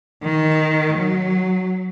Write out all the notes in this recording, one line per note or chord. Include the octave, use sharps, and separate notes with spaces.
D#3
F#3